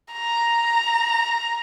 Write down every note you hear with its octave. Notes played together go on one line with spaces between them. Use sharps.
A#5